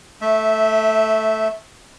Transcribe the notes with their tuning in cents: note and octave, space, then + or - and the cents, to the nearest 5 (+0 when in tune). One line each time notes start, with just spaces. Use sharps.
A3 +0 E5 -15